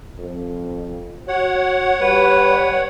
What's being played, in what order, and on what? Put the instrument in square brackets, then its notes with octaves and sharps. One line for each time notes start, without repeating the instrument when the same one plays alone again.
[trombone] F2
[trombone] F#4 [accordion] C#5 F#5
[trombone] G3 [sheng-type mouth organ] B4